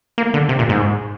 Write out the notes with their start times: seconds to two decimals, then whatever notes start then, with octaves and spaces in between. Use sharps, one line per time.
0.18 A#3
0.34 D3
0.49 C3
0.59 A#2
0.69 G#2